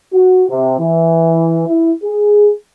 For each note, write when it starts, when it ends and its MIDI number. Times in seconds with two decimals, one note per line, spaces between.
0.13 0.44 66
0.50 0.75 48
0.79 1.63 52
1.68 1.92 64
2.03 2.51 68